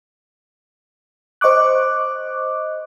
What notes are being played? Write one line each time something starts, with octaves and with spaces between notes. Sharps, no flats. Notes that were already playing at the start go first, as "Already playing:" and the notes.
C5 D#5 C#6 D6 F#6